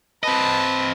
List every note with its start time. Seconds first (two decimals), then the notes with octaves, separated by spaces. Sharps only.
0.23 C4 B4 D#5 A5